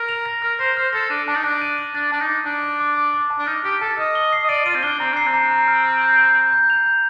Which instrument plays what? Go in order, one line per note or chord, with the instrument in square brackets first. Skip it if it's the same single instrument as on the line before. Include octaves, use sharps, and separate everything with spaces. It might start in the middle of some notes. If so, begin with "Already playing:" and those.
Already playing: [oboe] A#4
[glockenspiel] F7
A#6
[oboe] A#4 [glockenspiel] F6
[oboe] C5 [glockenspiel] A#6
[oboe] C5 [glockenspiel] F6
[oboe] A4 [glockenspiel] A#6
[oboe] D4 [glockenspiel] D#7
[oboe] D4 [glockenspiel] A5
[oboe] D#4
[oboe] D4 [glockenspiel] A5
[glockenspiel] D#7
D#7
[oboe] D4 [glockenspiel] A6
[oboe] D4 [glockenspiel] A5
[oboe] D#4
[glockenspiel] D6
[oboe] D4 [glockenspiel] A5
[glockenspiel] A5
D6
D6
D6
A5
[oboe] D4
[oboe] D#4 [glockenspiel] F6
[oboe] G4 [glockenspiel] F6
[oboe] A4 [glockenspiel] A5
[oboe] D#5 [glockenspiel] F6
[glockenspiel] G7
C7
[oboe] D#5
[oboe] D5 [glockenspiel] D#7
[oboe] F4 [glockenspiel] D#7
[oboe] C4
[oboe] D4 [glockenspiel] G7
[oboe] C4 [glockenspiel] A#5
[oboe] D4 [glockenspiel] C7
[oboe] C4
[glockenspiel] A#5
A#5
F6
F6
G6
G6
G6
G6
F7
G6